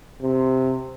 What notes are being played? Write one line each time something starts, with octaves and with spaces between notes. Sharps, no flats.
C3